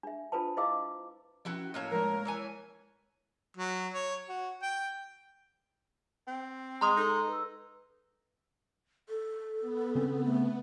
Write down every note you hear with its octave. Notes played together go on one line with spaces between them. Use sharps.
D4 E5
D4 F4 A4 B4 C5 A5
E4 C5 D#5 F5 D6 E6
F3 C#4 E4 F#4 G5
A2 A#3 C#5 F#6
F3 G#3 A#4
E3 C#5 G#5
F#3
C#5
F#4
G5
C4
G#3 A#5 C6 D#6
D#4 A4
B4 E6
A4
B3
C#3 C4 C#4
A3